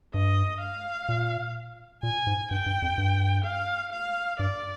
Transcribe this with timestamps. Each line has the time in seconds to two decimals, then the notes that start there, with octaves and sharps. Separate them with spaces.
0.14 G2 D#5
0.61 F5
1.09 A#2
2.03 A#2 G#5
2.27 G#2
2.51 G2 G5
2.66 G2
2.82 F2
2.98 G2
3.44 F5
3.92 F5
4.39 G2 D5